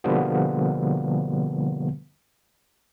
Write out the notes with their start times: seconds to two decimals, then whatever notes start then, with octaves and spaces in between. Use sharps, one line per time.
0.04 B2 D3 F3 G3 A#3 B3